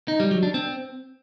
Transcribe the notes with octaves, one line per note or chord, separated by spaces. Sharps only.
D#4
G3
F#3
D4
C4